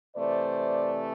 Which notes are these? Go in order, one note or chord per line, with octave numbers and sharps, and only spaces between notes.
C3 E3 A3 C5 D5